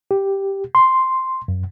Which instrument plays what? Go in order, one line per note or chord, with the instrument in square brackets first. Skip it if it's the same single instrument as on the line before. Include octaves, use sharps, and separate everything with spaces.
[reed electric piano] G4
C6
F#2